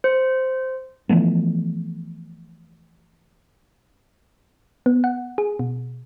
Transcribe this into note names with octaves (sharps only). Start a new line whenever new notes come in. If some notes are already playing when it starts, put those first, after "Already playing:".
C5
E3 F3 A3 B3
B3
F#5
G#4
B2